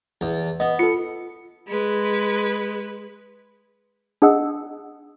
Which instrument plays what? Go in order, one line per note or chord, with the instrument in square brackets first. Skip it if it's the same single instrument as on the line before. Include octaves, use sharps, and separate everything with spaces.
[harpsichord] E2
[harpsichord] B3 [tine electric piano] D#5
[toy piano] F4 [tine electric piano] A4 C#7
[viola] G#3 B4
[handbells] D4 G#4 D#5 F#5 E6